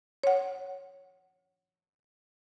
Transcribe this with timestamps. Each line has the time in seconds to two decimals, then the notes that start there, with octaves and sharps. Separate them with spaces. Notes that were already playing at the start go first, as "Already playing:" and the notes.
0.24 C#5 F#5